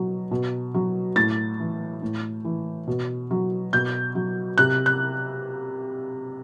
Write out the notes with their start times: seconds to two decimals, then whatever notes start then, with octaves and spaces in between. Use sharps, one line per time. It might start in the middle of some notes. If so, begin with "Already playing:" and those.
Already playing: B2 F#3
0.31 B2
0.74 F#3
1.16 A2 A6
1.60 E3
2.02 A2
2.45 E3
2.87 B2
3.31 F#3
3.73 B2 G6
4.15 F#3
4.58 C3 F#6
4.86 F#6